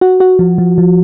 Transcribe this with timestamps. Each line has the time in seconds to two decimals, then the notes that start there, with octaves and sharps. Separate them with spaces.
0.01 F#4
0.20 F#4
0.39 F3
0.58 F3
0.78 F3